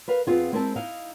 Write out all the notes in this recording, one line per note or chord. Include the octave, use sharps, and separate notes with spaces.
A#4 B4 F5
F2 G#2 B3 C4 F4 G#4
G#3 C4 E4 A#4 C5 A5
D#4 E4 D#5 F5